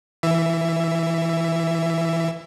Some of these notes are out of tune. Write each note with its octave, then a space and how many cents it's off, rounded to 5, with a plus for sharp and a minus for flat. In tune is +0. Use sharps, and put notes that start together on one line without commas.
E3 +0 E5 +15